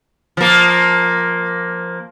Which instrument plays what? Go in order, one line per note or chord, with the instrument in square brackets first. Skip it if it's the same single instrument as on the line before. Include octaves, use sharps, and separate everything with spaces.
[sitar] F3 A#3